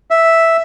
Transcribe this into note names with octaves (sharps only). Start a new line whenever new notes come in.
E5